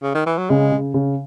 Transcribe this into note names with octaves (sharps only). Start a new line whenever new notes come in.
C#3
D#3
E3
F#3
C#3 G#3
C#3
C#3